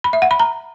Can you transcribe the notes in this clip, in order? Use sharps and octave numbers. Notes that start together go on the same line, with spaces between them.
B5
E5
F#5
B5
A#5